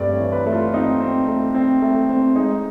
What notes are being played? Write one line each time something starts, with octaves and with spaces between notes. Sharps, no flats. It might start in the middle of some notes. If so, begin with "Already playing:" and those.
Already playing: G2 A3 C4 D5
C#5
E3
B4
A3
F4
C4 D#4
C4
A3
C4
A3
C4
G#3 D#4